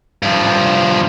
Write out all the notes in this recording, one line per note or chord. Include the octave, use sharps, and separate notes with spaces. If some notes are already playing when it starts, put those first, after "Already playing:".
G2 F3